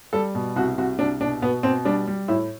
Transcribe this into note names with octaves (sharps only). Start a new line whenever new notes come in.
G3 A4
B2
C2 F#4
C2 F#4
C2 D4
B2 D4
B2 B3
B2 C4
G3 D4
G3
A2 E4